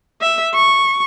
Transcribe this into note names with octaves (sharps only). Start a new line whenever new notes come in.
E5
C#6